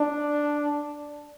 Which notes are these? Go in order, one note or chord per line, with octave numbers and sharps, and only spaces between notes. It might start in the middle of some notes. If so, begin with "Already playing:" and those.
Already playing: D4